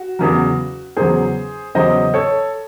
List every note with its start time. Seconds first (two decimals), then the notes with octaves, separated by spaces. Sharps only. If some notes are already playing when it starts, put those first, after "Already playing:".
Already playing: F#4
0.19 E2 C#3 F#3
0.97 E2 C#3 F#3 G#4 C5
1.75 E2 C#3 F#3 C5 D#5
2.14 A4 C#5